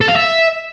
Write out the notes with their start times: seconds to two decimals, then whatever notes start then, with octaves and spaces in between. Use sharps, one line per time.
0.01 A4
0.08 F5
0.16 E5